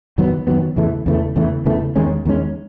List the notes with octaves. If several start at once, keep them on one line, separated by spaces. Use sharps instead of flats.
F#2 D#3 F#3 B3
F#2 D#3 F#3 B3
E2 C#3 E3 A3
E2 C#3 E3 A3
E2 C#3 E3 A3
E2 C#3 E3 A3
E2 D#3 G#3 C#4
E2 D#3 G#3 C#4